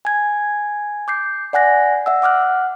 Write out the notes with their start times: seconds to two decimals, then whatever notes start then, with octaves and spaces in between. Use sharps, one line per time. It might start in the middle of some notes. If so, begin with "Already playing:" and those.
0.05 G#5 G#6
1.08 D6 G6 C7
1.53 D5 F#5 G#5 F#6 A#6
2.06 E5 F#5 E6
2.22 F#5 D6 F6 F#6